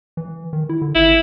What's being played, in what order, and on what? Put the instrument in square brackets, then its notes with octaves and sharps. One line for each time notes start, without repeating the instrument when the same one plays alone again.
[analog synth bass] E3
D#3
E4
D3
[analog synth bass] G#1 [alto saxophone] E4